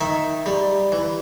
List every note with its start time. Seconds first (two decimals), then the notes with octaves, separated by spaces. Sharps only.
0.01 D#3 E5
0.46 G3
0.92 E3